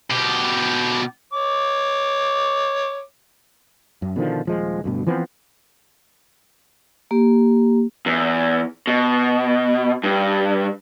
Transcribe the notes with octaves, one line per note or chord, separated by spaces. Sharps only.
B2 G4
C#5 D6
F#2
B2 D3 D#3 F3
D#1 F3 G#3
D2 G2 B2
E3 F3 B3 C4
A#3 G4
E2
B2
G2